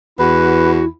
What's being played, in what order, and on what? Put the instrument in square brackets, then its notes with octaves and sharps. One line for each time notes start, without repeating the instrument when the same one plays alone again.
[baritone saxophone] E2 [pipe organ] E4 [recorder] F#4 [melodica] B4